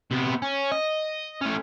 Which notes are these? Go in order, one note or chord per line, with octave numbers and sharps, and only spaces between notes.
C3 B3
C#4
D#5
A3 C#4